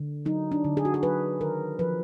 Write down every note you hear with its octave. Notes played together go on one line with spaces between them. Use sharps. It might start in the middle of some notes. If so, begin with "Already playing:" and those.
Already playing: D3
F#3 D#4
D4
D3
G#4
F#4
G#4
F#3 B4
D#3 A#4
F3 B4